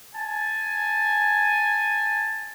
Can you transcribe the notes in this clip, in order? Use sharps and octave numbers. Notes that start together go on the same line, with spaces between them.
G#5 A5